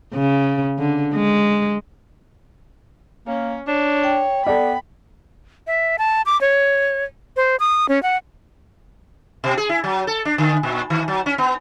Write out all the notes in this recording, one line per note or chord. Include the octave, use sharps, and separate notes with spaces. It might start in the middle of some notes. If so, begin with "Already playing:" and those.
C#3
D3
G#3
A#3 C#4
D4 C#5
G5
B3 A4 D5 B5
E5
A5
D6
C#5
C5
D#6
C#4
F#5
B2
G#4
E4
F#3
A4
D4
D3
A#2
D#3
F#3
C#4
B3